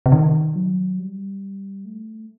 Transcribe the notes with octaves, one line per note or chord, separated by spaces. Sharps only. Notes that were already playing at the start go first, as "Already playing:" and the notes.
C3
D#3
F#3
G3
A3